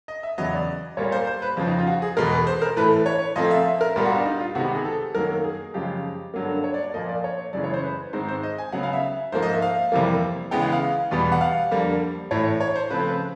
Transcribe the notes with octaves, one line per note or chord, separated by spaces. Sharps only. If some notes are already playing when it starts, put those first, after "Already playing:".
D#5
E5
E2 C#3 F#3 B3 D#5
D5
A#2 G3 A#3 C#5
C5
C5
B4
F2 C#3 F3
D#4
F4
F#4
G#4
E2 B2 G#3 A#4
B4
C5
A#4
A2 E3 A3 B4
C#5
A#2 F3 A3 C4 D#5
E5
E5
A#4
A#2 G3 B3 A#4
F#4
D4
D#4
F4
C3 D#3 G#3 B3 F#4
G4
G#4
A4
F#2 D#3 F#3 A#3 A#4
G#4
F#2 C#3 F3 G#3 G4
G2 D3 F#3 A#3
C#5
D5
D5
A#2 F3 A#3 D#5
D5
C#5
F#2 C#3 E3 G#3 D5
C#5
C5
B4
G#2 D#3 G#3 C4 C5
C5
D#5
G#5
C#3 F#3 B3 F#5
F5
E5
G#2 F3 A#3 C5
D#5
E5
F5
F2 C3 E3 G3 A#3
C#3 E3 G#3 B3 G5
F#5
F5
E2 B2 G3 B3
F#5
F5
F2 D3 G3 A#3
A2 E3 A3 C#5
C#5
C5
C#3 F3 A3 C4 B4
C5
B4